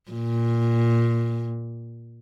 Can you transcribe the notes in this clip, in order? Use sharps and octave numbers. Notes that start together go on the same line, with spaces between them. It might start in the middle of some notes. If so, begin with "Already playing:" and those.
A#2